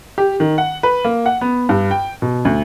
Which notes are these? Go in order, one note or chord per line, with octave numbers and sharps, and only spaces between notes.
G4
D#3
F#5
B4
A#3
F#5
B3
G2
G5
B2
D2